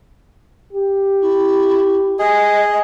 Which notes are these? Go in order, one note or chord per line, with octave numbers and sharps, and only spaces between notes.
G4
E4
G#4 D#5